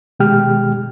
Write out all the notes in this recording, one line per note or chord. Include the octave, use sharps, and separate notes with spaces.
B2 D#3 G#3 G4 G5 F6